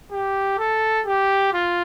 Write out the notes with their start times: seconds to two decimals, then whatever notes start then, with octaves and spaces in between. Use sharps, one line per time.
0.12 G4
0.59 A4
1.06 G4
1.53 F4